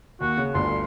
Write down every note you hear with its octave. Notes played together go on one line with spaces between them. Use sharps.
D#2 F#4
C#3
G1 D2 G2 C6